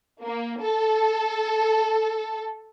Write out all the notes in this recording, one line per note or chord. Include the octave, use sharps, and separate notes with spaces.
A#3
A4